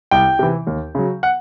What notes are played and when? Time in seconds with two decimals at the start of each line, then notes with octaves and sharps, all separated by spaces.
0.11 C2 G5
0.39 C3 E3
0.67 D#2
0.95 C#3 F#3
1.23 F#5